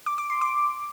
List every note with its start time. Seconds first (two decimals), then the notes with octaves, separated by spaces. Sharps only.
0.06 D6
0.18 D6
0.30 C6
0.41 D6